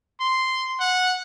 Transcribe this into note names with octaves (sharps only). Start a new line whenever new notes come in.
C6
F#5